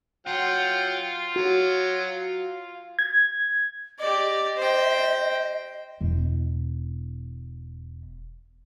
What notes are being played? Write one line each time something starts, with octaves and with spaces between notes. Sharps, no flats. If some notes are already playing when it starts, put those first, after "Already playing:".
F#3 F4 F#5 G5
F#3 F#4
G#6
G4 D5 D#5
C5 G5
E1 E4